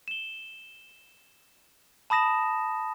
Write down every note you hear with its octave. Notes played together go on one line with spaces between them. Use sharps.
E7 G7
A5 B5 D#6 A#6 E7